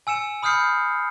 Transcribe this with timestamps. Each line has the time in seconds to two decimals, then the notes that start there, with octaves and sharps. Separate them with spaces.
0.07 G#5 E6 C#7 E7
0.43 B5 D#6 F6 G6 C7 C#7